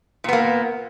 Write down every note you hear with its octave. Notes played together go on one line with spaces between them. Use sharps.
A#2 A#3 B3